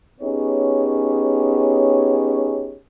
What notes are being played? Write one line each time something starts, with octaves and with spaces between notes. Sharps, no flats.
B3 C#4 D#4 G4 G#4 C#5